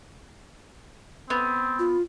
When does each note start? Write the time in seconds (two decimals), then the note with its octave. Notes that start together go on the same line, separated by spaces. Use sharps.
1.30 B3 C4
1.79 F4